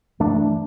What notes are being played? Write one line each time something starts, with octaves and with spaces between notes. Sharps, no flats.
G2 E3 A3 D4